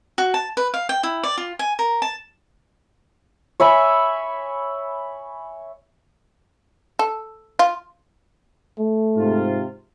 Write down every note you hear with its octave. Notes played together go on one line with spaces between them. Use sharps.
F#4
A5
B4
F5
G5
E4
D5
F4
G#5
A#4
A5
C#5 E5 G#5 B5
A4
F4
A3
G#2 C3 F4